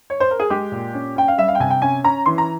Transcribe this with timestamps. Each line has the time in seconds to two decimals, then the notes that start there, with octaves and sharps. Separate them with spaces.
0.10 C#5
0.20 C5
0.31 A#4
0.40 G#4
0.50 G#3 G4
0.72 A#2
0.94 C#4
1.16 C#4 G5
1.28 F5
1.38 G3 E5
1.48 F5
1.55 G5
1.60 C3 G#5
1.70 G5
1.82 C#4 G#5
2.04 C#4 A#5
2.26 E3 C6
2.38 A#5